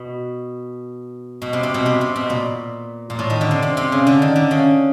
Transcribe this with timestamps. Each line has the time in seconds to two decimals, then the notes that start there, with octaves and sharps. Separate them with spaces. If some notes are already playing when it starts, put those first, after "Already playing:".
Already playing: B2
1.42 B2
1.53 C3
1.63 C3
1.74 B2
1.86 C3
2.01 C3
2.16 B2
2.30 A#2
3.10 A#2
3.19 A2
3.30 D#3
3.41 D3
3.51 C3
3.62 C3
3.77 C3
3.92 C#3
4.07 D3
4.22 D#3
4.36 D3
4.51 C#3